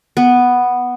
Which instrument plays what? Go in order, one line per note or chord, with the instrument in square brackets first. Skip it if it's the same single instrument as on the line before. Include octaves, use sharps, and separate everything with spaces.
[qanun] B3